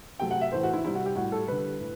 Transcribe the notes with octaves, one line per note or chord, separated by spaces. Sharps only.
C3 F#3 A3 G5
F#5
E5
A2 E3 A3 C5
F#4
E4
C3 G3 E4
F#4
G4
A2 G3 F#4
A4
D3 G3 B4
A2